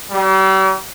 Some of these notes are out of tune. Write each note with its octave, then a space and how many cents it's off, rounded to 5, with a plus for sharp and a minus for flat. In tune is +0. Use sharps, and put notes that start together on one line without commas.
G3 -45